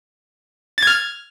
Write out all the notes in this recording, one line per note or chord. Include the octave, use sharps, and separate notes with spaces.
F6 G#6 A6